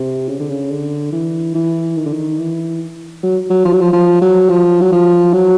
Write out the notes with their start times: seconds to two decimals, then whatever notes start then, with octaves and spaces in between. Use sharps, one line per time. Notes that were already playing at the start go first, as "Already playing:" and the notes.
Already playing: C3
0.28 C#3
0.39 D3
0.50 C#3
0.71 D3
1.12 E3
1.55 E3
1.97 D#3
2.06 D3
2.13 D#3
2.39 E3
3.23 F#3
3.50 F#3
3.65 F3
3.73 F#3
3.80 F3
3.93 F3
4.21 F#3
4.49 F3
4.81 F#3
4.92 F3
5.33 F#3